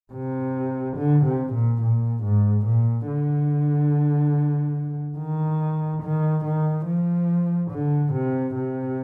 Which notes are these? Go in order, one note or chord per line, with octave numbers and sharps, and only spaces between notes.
C3
D3
C3
A#2
A#2
G#2
A#2
D3
D#3
D#3
D#3
F3
D3
C3
C3